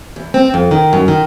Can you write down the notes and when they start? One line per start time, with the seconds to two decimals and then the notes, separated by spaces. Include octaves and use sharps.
0.16 E2
0.34 C4
0.54 F2
0.71 D#3
0.93 F#2
1.08 D#3